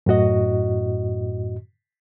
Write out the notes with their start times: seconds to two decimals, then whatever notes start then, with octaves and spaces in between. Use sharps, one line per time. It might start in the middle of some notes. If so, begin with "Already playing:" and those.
0.06 F#2 A2 F#4 D#5